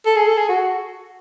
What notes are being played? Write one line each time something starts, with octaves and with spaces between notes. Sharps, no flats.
A4
G#4
A4
G#4
F#4